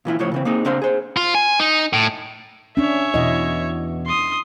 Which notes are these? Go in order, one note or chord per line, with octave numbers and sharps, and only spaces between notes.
A#2 E3 E4 F4
C#2 A2 F3 C#5
C#3 E3 C4
A#3 C4 D#4 G#4
C#3 C4 D4 C5 F5 C6
G#4 C5
F4
G#5
D#4
A2
C#4 D4 C#5 E5
E2 B2 E4 D#5
C6 D#6